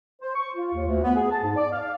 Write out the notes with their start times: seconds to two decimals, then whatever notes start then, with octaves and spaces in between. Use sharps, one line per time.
0.21 C5
0.35 C#6
0.54 F4
0.74 D#2
0.86 D2
1.02 B3
1.15 G#4
1.30 A5
1.43 G#2
1.56 D5
1.71 F5